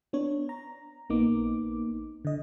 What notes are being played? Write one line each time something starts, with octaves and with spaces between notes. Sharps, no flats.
B3 D4 C#5
A#5
A#1 A#3 B3 D#4 D6
D3 D#5